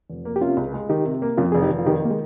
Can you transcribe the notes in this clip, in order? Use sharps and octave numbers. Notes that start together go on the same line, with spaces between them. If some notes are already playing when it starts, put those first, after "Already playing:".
F1
A#3
G4
C3 C#4 F4
C#2
G#3
D#3 D#4 G4
C3
A#3
F2 C#4 F4
F1 G#4
D#4 G4
F1
F4
D#3 D#4 G4
A#3
G#3